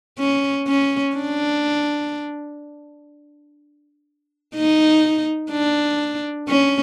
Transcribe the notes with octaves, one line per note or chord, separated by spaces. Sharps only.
C#4
C#4
D4
D#4
D4
C#4